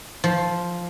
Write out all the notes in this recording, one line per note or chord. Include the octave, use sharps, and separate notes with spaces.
F3